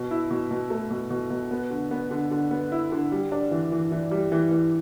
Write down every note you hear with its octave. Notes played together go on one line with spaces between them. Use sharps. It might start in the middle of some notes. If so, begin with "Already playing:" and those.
Already playing: B2
E4
B2
B2
A3
B2
B2
B2
B3
D3
B3
D3
D3
B3
E4
D3
G3
D4
E3
E3
E3
G3
E3
E3